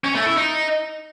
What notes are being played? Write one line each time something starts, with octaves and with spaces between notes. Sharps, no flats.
C#4
A3
E4
D#4